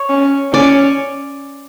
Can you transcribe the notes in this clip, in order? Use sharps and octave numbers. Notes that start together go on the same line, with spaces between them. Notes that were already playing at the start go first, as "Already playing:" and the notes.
Already playing: C#5
C#4
C#4 D5